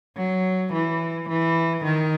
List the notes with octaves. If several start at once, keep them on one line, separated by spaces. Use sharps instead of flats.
F#3
E3
E3
D#3